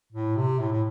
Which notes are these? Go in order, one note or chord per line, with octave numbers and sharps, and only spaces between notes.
A2
C3
A2
A2